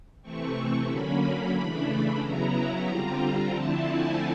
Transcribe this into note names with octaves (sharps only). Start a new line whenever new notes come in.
C3 E3 A3 C4 C#6
D3 F#3 A#3 C#4 B5
C#3 E3 A3 D4
C#3 F#3 B3 E4 A#5
D3 G3 C4 F4
D3 F3 A3 C4 E4 A5
G#5